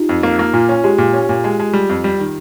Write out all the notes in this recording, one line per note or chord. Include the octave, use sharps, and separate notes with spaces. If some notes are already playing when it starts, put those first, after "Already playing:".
Already playing: D#4 F4 G4
F2
A#3
A#3
A#2 F4
C#4
G#3 G4
A#2
C#4
A#2
G#3
G#3
G3
F2
G3
D#3